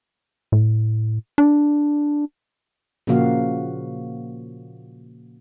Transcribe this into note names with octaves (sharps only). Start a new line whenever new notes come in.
A2
D4
A#2 C#3 F3 A#3 F#4 F5